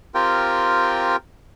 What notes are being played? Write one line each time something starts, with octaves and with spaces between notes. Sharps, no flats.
C4 F4 G4 A#4 G5